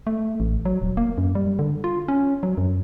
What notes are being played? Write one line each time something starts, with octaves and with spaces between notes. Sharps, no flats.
A3
A1
F#3
D#1
A#3
F#2
G3
D3
F4
C#4
F#3
F#2